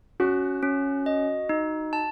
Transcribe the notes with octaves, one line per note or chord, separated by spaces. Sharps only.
C#4 F#4
C#4
D#5
D#4
A5